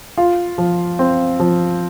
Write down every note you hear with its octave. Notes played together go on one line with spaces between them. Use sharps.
F4
F3
C4
F3